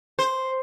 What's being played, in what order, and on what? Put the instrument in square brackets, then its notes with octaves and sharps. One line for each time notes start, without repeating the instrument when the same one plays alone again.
[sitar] C5